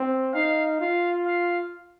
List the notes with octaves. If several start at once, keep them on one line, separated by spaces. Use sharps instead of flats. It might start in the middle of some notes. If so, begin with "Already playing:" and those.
Already playing: C4
D#4 F5
F4 F5
F5